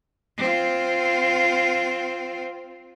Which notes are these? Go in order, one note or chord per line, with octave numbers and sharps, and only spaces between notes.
C4 F4